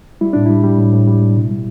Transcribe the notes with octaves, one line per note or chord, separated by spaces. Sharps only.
G3 E4
A2 D4
G3 E4
G3
A2
A2
G3
A2
B2
G3